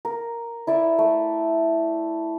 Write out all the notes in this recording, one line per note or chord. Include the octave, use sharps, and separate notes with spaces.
A#4
E4 D5 E5
A3